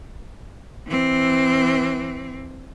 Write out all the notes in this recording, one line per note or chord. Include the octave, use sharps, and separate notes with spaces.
E3 C4